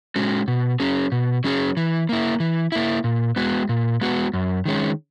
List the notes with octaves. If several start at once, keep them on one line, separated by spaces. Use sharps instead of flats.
G#3 C#4 F#4
B2
F#3 C#4 G#4
B2
F#3 C#4 G#4
E3
A#3 E4
E3
A#3 E4
A#2
G#3 B3 F#4
A#2
G#3 B3 F#4
F#2
D#3 G#3 C#4